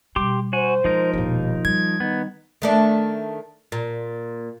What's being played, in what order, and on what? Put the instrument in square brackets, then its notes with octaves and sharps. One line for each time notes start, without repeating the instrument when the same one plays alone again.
[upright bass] B2 G3 [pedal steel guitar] G4 C6 D6
[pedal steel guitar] F#4 G#5 [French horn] C5
[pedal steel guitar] F3 D#4 A#4 [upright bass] G#3
[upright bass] E1 A#2 [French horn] D#2
[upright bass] G3 [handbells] G#6
[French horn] D#3 [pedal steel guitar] B3
[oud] D#3 A3 D4
A#2